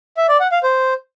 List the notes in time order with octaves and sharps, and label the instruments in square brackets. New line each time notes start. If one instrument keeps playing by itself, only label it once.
[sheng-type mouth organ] E5
D5
F#5
F5
C5